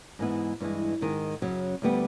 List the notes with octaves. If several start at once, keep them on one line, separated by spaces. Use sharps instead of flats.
G#2 E3 G#3 B3 E4
G2 E3 G#3
G#2 D#3 G#3
F#2 C#3 F#3
D2 D3 G3 B3